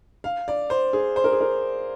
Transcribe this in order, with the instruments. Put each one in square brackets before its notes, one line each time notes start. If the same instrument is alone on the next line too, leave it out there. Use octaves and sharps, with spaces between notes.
[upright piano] F5
D5
C5
G#4
C5
A#4
G#4
A#4